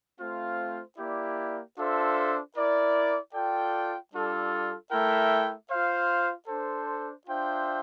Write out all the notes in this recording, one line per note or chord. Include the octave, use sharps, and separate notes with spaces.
A3 C4 F4 C5 F5
A#3 E4 G4 D5
D4 F4 A4 C5 E5
E4 A#4 D5
F4 A4 D5 G5
G3 D4 F4 A4
A3 E4 A#4 E5 G5
F4 C5 F5
D4 A4 C5
D4 F4 C5 E5 G5